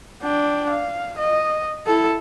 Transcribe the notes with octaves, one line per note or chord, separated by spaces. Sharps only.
D4 G5
F5
D#5
E4 A4